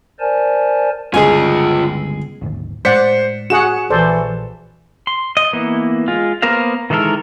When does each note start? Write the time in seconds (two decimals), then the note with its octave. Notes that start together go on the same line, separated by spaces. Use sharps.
0.20 A#4 C5 D5 G#5 A5
1.14 G1 C#2 F4 G#4 D#5 G#5
2.41 D1 G#1 D#2
2.85 A2 G#3 C5 D5 F#5 B6 C#7
3.50 F#4 G#4 F#5 C#6 E7
3.90 A#1 E3 A4 C5 D5
5.07 C6
5.37 D#5
5.53 E3 A#3 B3
6.08 G#3 F4
6.42 A#3 B3 A#4 C5 F5
6.90 D#3 E3 G#3 A4 A#4